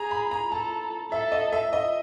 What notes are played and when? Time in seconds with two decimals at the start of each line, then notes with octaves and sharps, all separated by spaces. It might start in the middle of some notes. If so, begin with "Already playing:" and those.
Already playing: G#4 A#5
0.11 B5
0.31 A#5
0.52 A4 A5
1.12 A4 E5
1.32 D#5
1.52 E5
1.73 D#5